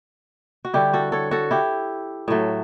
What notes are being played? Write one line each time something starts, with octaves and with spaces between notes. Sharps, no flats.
F#4
D3 G3 E4 G4
F#4 A4
A4 C#5
F#4 A4
E4 G4
A2 F#3 A3